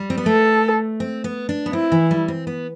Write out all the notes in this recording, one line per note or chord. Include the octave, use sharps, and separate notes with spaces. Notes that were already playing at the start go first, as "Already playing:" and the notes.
Already playing: G3
C4
B3
A3 A4
C4
B3
D4
B3
C4 E4
E3
G3
C4
B3